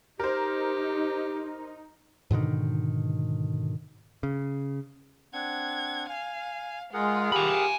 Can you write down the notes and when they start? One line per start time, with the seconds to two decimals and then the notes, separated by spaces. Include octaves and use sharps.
0.20 D#4 G4 A#4 C5
2.31 G#2 B2 D3 D#3
4.23 C#3
5.33 C4 D4 F#5 G#6
6.09 F5 G#5
6.93 G#3 F4 G#4 A#4 F#5
7.32 G4 G#5 B5